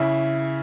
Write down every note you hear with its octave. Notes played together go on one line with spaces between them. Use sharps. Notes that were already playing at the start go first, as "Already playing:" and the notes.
Already playing: C#3 E4